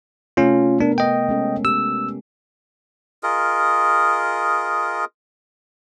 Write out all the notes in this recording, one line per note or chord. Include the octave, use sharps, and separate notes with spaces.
C3 A3 C#4 F4 A4
B3 D4 A#4
D#5 G5
G#3 C#4 A4
G4 E6
F4 G#4 A#4 D#5